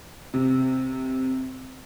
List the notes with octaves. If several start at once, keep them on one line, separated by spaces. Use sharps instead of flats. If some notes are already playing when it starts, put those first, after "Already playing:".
C3